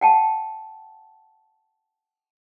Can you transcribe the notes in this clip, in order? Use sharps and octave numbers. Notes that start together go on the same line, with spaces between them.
F#5 G5 A5